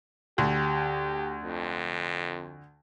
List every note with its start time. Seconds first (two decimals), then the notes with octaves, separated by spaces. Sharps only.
0.38 D2 G4
1.42 F2